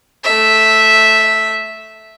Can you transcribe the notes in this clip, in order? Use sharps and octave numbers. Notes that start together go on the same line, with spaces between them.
A3 E5